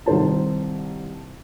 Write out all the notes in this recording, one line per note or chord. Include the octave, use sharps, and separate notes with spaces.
C2 D#3 C5 A5